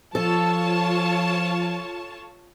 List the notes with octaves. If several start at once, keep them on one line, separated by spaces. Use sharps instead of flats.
F3 F4 A4 C#5 A5